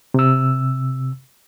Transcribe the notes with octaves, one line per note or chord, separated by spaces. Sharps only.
C3 E6